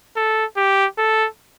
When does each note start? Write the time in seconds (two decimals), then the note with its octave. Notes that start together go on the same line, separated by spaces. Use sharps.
0.16 A4
0.57 G4
0.98 A4